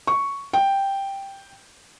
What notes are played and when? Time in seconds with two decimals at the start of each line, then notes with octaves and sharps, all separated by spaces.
0.07 C#6
0.53 G5